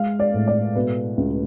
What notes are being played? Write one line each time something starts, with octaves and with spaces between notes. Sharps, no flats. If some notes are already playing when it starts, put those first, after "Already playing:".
Already playing: G#3 F5
D5
A2
D5
B2 B4
C#2